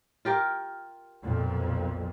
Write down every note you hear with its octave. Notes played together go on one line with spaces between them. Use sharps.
F4 G4 A#4
B1 F2 A#2